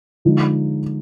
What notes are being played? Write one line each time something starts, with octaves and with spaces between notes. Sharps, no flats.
D3 F3 G#3 D#4